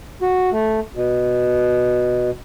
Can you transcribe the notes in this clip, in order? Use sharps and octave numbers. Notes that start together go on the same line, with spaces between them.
F#4
A3
B2